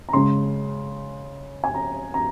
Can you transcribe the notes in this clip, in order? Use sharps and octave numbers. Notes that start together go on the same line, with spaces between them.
A#5
C#3 G#3 C6
G#5
A#5
A#5